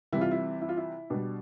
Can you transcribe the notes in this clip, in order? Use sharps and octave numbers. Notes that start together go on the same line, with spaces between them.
C3 E3 G3 E4
F4
E4
E4
F4
E4
B2 G3 D4